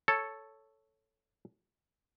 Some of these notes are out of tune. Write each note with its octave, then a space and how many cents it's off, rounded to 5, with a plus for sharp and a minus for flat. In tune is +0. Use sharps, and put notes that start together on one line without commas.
A4 +0 C#5 +0